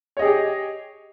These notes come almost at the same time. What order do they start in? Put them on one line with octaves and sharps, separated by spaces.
C#5 D#5 G#4 G4